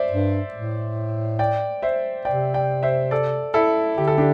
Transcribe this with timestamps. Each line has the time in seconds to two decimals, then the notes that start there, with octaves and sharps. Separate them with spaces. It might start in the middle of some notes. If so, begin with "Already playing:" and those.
Already playing: C5 D5 E5
0.11 G2
0.54 A2
1.39 D5 G5
1.82 C5 E5
2.25 C3 D5 G5
2.54 D5 G5
2.83 C5 E5
3.11 A4 D5
3.54 E4 A4
3.98 D3 G4
4.08 A4
4.18 D4 G4